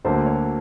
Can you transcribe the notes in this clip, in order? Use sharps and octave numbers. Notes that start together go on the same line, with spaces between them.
D2 D3 F#3 A#3 D4 C5
C#5